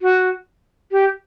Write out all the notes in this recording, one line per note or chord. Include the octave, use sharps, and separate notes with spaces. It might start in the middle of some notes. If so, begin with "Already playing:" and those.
F#4
G4